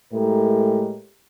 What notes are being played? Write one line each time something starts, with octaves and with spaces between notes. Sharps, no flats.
A2 G#3 G4 A4 A#4